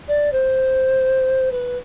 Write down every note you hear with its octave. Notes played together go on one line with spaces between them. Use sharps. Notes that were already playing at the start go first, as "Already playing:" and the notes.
D5
C5
B4